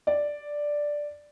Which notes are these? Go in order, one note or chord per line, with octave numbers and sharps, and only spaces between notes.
D5